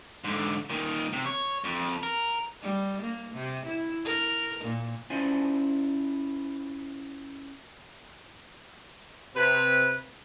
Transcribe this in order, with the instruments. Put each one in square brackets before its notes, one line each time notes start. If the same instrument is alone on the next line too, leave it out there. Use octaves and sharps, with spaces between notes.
[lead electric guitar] G#2 D3
A#2 D#3
C3
C#5
F2
A#4
[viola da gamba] G3
A#3
C3
E4
A#4
A#2
[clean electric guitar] C#4 E4 F4 C5 D5 G#5
[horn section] C3 B4